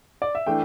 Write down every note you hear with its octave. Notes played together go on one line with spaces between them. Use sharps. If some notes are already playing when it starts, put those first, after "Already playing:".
D5
E5
E3 A3 D4 G5